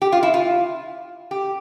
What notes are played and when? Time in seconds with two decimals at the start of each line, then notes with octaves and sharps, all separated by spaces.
0.02 G4
0.12 F4
0.23 E4
0.34 F4
1.31 G4